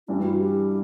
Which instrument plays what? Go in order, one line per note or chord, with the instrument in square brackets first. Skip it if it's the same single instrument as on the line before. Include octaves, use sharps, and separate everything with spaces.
[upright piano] G2 E3 G3 [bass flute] E4
[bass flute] F#4
G4